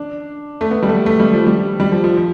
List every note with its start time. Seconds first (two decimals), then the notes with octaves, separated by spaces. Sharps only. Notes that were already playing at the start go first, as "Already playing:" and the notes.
Already playing: D4
0.61 A3
0.71 B3
0.83 G3
0.89 A3
1.06 A3
1.19 G3
1.33 F3
1.47 G3
1.80 G3
1.92 F3
2.04 F3
2.17 F3